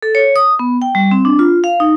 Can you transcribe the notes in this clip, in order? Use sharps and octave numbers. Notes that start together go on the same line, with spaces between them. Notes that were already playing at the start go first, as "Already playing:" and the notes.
A4
C#5
D#6
B3
G5
G3
C4
D4
F4
F5
D#4